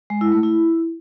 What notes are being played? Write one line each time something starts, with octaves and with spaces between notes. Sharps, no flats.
G#3
E4
A3
E4